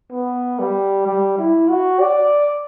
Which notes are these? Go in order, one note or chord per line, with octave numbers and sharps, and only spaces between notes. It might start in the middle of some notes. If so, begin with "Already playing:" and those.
B3
G3
G3
E4
F#4
D5